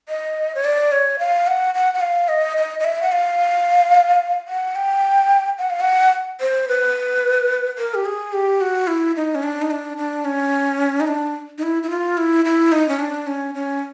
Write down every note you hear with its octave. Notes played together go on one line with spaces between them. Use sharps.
D#5
C#5
D5
C#5
F5
F#5
F#5
F#5
F5
D#5
D#5
D#5
E5
F#5
F5
F#5
G5
F#5
F5
F#5
C5
B4
A#4
G4
G#4
G4
F#4
E4
D#4
C#4
D4
D#4
D4
D4
C#4
D#4
D4
D#4
E4
E4
F4
E4
E4
D#4
C#4
D4
C#4
C#4